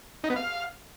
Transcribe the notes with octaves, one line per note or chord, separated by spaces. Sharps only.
D#4
B3
F5